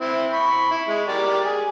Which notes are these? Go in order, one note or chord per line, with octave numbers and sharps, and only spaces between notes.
C4 E4
B5 C#6
E4
G#3
G4 A#4 D5
G#4